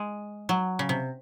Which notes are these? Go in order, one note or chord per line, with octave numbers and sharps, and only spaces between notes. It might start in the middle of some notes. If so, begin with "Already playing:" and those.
Already playing: G#3
F#3
C#3
C3